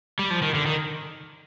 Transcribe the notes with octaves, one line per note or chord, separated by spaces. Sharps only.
G3
F3
D#3
D3
D#3